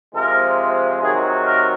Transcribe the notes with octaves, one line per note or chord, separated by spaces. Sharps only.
C3 F3 G#3 A#4
C3 D#3 F#3 G#4
A#4